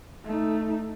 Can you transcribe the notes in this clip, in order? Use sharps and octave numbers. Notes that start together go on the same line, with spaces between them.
A3 D#4